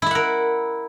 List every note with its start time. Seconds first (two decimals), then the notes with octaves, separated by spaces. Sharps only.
0.02 E4
0.06 E5
0.11 F#5
0.15 A#4